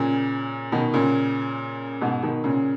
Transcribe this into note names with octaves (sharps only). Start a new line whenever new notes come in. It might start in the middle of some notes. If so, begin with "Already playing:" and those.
Already playing: A#2 C#3
B2 D#3
A#2 C#3
G#2 B2
B2 D#3
A#2 C#3